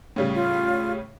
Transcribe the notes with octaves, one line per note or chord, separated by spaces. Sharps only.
A2 C#3 G3
F4